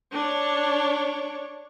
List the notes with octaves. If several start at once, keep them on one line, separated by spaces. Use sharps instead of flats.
D4 C#5